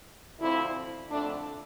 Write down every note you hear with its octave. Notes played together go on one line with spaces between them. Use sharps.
D2 D3 F3 C4 E4
F2 D3 A3 D4